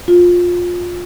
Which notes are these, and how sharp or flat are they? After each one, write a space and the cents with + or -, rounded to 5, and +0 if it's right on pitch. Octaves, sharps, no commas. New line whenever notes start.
F4 +20